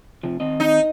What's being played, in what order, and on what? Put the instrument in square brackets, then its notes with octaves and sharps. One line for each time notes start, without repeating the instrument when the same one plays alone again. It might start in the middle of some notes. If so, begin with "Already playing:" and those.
[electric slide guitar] C3 F3
D#3 C4 D#5
[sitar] D#4